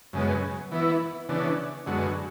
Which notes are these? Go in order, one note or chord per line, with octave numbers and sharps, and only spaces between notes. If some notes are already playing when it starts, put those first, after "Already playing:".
F#2 C#3 G#3 B3
E3 B3 E4
C#3 E3 B3 D4
F#2 D3 G#3 B3 F#4